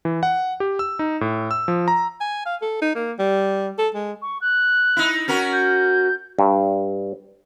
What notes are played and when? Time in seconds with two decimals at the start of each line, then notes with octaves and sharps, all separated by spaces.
0.05 E3
0.23 F#5
0.60 G4
0.79 E6
0.99 D#4
1.21 A2
1.51 E6
1.68 F3
1.88 A#5
2.21 G#5
2.46 F5
2.62 A4
2.82 D#4
2.95 A#3
3.19 G3
3.78 A4
3.95 G#3
4.22 C#6
4.41 F#6
4.97 D#4 E4
5.28 C#4 F#4 A#4
5.53 G6
6.39 G2